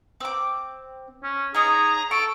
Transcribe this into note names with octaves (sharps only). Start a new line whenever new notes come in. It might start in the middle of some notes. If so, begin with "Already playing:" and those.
C4 D6
C#4
D#4 G#4 C#5 A#5
A4 C#6 D7